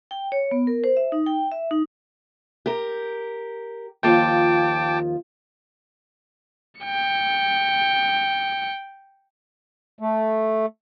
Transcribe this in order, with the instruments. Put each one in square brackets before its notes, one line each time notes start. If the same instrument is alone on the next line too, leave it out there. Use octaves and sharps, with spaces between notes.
[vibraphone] G5
C#5
B3
A#4
C5
E5
D#4
G5
E5
D#4
[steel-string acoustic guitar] G4 A#4
[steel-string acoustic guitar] D#2 F3 F4 [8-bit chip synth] G5 A5 D6
[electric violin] G5 C#7
[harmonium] A3